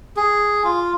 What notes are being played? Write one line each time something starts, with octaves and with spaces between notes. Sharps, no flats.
G#4
F4